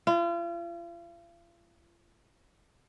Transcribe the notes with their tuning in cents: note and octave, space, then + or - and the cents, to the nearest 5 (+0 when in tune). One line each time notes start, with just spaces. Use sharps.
F4 -40